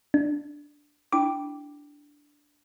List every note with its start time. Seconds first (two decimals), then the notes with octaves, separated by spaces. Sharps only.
0.14 D4
1.12 D4 E4 G5 D6